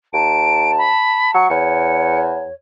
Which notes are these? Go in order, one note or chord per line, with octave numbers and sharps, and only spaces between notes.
D#2 A5 D7
B5
F#3 C#7
E2 C#5 C#7